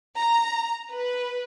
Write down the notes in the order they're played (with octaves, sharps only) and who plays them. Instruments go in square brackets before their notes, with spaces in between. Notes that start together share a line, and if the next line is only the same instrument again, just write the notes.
[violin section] A#5
B4